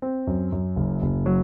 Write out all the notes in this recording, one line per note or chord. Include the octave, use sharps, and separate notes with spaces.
C4
F#2
F#2
F#1
F#1
F#3